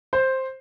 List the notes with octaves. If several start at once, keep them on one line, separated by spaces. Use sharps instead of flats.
C5